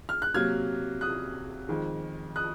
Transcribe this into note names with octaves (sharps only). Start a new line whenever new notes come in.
F6
F#6
C3 F#3 A#3 F6 G#6
D#6 F#6
F2 D#3 G#3
D#6 F#6